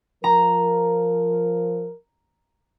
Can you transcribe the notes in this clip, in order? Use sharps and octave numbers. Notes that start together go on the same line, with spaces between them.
F3 A#4 A#5